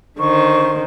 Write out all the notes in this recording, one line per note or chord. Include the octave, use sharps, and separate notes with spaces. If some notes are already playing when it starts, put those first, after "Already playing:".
D3 D#3 C5 C#6